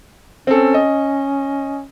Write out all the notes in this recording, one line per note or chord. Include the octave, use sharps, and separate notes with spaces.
C4 C#4 A4
D#5